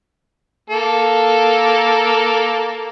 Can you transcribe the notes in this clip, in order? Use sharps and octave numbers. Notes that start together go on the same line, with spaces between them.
A#3 A4